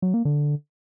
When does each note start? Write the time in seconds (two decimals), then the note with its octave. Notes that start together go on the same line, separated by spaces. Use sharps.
0.02 F#3
0.14 A#3
0.25 D3